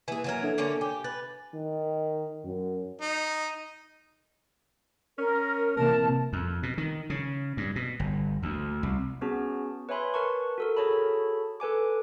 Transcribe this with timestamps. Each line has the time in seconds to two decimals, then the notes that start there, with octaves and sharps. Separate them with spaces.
0.08 E3 A#3 G#4 G#5
0.24 E3 F#3 A#4
0.43 D4 A4 E5
0.58 D3 A#3 C#4
0.81 G4 G#5
1.04 B4 A6
1.54 D#3
2.45 F#2
3.01 D#4
5.18 C#4 A#4
5.77 C3 E3 A#3 A#4 A5
6.33 F2
6.63 B2
6.78 D#3
7.10 C#3
7.57 G2
7.76 B2
8.00 G1
8.43 D2
8.83 C2
9.21 B3 C#4 F#4 G#4 A5
9.89 B4 C#5 E5 G#5 B5 C6
10.14 A#4 B4 A5 C#6
10.58 F#4 A4 A#4
10.76 F#4 G#4 A4 C#5 A5 B5
11.60 A4 B4 G#5 D6